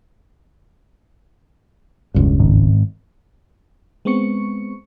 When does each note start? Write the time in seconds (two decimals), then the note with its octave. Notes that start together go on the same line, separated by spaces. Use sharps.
2.14 E1 C#2 G2
2.39 G#1
4.05 G#3 B3 C4 C#6 C#7